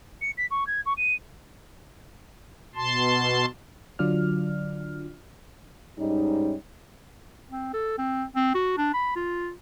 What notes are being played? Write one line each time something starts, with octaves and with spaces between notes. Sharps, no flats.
C#7
B6
C#6
G#6
C#6
D#7
B2 A5 C6
D3 F#3 D4 F4 D5 F6
G#2 G3 C#4 D#4
C4
A4
C4
C4
F#4
D4
B5
F4